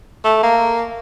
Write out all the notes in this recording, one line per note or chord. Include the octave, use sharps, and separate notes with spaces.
A3
A#3